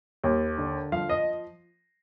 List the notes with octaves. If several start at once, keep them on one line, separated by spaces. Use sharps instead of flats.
D#2
D3
F3 F5
D#5